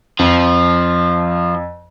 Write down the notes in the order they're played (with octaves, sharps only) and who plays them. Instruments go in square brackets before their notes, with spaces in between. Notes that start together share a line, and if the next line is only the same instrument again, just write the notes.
[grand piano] F2 [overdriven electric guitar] F3